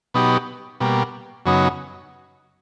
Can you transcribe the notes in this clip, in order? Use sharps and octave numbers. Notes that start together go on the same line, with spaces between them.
B2 F#3 B3 D#4 G4
B2 G3 A#3
F#2 C#3 F#3 B3 D#4